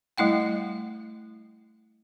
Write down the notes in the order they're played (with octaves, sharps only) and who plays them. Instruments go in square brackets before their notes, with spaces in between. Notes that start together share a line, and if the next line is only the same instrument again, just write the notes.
[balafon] G3 A3 E4 F#5 G5